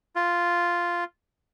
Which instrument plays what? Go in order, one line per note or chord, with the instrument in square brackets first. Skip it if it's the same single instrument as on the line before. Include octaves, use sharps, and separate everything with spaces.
[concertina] F4